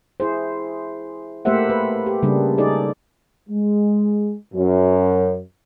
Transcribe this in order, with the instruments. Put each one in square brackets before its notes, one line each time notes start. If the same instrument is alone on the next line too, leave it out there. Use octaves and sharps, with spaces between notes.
[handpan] E4 G#4 C5
A3 A#3 G4 C5 E5 F#5
B4
G4
C#3 G3 A#3 D4 G#4
D#4 G#4 A4 D5
[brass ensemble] G#3
F#2